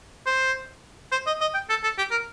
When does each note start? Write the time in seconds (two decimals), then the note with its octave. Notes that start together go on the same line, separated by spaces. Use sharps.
0.26 C5
1.12 C5
1.27 D#5
1.41 D#5
1.54 G5
1.70 A4
1.83 A4
1.98 G4
2.11 A#4